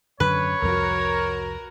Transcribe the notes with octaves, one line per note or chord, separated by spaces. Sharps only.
F#2 D3 B4 C#5
C2 F2 F3 F#4 A#4